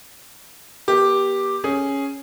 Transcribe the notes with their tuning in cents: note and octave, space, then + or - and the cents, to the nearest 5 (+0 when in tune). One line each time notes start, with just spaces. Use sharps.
A#3 +45 G4 +0
C#4 +0 G#4 +0